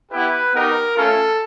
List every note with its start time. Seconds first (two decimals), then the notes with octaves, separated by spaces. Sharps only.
0.12 B3 E4 G4 B4
0.54 B3 D#4 G4 A#4
0.96 A3 C#4 F4 A4